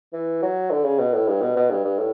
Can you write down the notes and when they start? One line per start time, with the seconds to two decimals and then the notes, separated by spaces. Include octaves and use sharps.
0.13 E3
0.42 F#3
0.71 D3
0.84 C#3
0.98 B2
1.13 A2
1.27 G2
1.41 B2
1.56 B2
1.70 G2
1.85 G2
1.98 A2